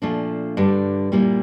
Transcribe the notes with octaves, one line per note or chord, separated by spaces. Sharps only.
A#2 F3 A3 D4
G2 D3 G3
A#2 G3 A#3 E4